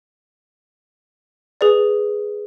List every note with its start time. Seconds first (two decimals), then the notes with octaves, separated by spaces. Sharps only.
1.61 G#4 B4 D5